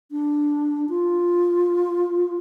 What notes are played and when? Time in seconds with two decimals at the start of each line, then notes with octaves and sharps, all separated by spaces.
0.11 D4
0.89 F4